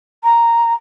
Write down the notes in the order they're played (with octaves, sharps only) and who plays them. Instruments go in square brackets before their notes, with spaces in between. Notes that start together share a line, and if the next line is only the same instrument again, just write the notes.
[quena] A#5